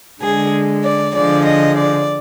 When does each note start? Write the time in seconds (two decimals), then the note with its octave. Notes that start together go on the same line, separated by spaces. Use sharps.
0.21 D3 G#3 G#4
0.84 D5
1.15 D3 F3 G#3 D5
1.46 D#5
1.77 D5